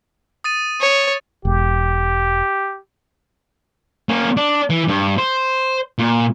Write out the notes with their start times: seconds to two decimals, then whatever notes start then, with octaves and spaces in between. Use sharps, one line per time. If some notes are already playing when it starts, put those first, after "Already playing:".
0.44 D#6 A6 D#7
0.81 C#5
1.45 E1 G4
4.09 A#3 C#4
4.37 D4
4.70 E3
4.88 G2
5.18 C5
5.99 A#2